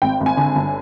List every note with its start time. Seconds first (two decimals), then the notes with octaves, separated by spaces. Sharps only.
0.02 G#1 G5
0.21 G#1
0.26 G#5
0.37 D3
0.56 G1